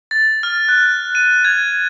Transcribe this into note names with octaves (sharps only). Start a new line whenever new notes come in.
A6
F6
F#6
D#7
G#6